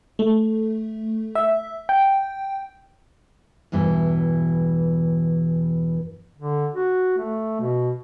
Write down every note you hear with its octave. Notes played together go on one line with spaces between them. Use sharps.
A3
E5
G5
E2 G2 B2 E3
D3
F#4
A3
B2